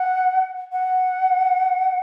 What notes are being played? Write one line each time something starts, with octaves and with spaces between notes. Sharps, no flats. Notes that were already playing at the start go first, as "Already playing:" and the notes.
Already playing: F#5
F#5